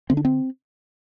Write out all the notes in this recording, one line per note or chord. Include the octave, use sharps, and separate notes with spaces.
D3 C4
D4
C4